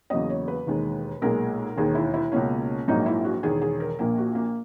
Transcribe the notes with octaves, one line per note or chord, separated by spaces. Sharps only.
E2 C#3 F#3 A#3 D#5
C#5
B4
E1 D#2 D#3 G#3
B1 A#2 G#3 A#4
E1 D#2 D#3 G#4
E4
E4
C#2 B2 A#3 C#4
A#1 G#2 F#3 A#3 D#4
E4
F#4
E1 E2 D#3 G#4
G#4
A#4
A#1 A#2 A#3 A#4
F#4
A#3